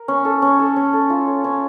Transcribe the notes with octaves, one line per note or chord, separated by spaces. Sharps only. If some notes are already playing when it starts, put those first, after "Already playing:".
Already playing: A#4
C#4
A4
C#4
A4
C#4
A4
F4
C#5
C#4